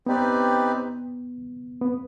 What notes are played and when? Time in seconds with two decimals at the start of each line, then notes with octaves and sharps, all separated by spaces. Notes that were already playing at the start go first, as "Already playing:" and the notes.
0.06 B3 C4 D#4 G4 B4 D5
1.81 B3